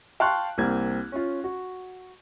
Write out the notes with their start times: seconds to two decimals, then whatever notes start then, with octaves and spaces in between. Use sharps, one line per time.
0.20 F5 G5 A5 C6 C#6 F#6
0.58 C2 A#3 C4 G#6
1.12 C#4 F4
1.44 F#4